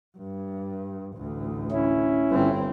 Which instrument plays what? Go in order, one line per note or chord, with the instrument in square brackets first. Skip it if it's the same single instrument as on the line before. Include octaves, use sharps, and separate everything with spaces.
[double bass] G2
A1 D2
[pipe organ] C#4 E4
[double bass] G1 C4